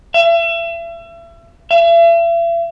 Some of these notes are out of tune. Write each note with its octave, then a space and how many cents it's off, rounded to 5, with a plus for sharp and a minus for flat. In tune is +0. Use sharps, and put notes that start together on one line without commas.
E5 +35
E5 +40